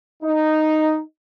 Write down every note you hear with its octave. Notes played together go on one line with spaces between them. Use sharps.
D#4